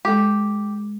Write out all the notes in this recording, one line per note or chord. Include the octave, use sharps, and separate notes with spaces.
G#3 G4 A4